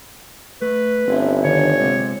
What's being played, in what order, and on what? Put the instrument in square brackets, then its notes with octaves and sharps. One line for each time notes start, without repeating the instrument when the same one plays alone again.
[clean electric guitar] A3 [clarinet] B4
[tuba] G1 [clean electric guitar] C4 C#4 E4
[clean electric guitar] D3 D#3 [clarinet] C#5
[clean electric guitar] C3 G#3 C4